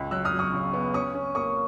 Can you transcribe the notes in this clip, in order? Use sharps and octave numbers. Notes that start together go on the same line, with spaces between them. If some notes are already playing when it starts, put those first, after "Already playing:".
Already playing: C#2
F#3 E6 F#6
D#6 F6
F#3
C#6 D#6
C#3
B3
C#4 C#6 D#6
C#4
A#3 C#6 D#6